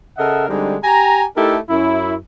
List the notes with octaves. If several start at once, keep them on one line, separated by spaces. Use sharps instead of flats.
C#3 A4 A#4 D#5 E5 F#5
D3 G3 G#3 C4 D4 D#4
G4 G#5 A#5
A3 D#4 E4 G4 A4 A#4
F#2 E4